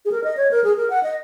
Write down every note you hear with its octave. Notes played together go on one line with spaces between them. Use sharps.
G#4
A#4
D#5
C#5
A#4
G#4
A#4
F#5
D#5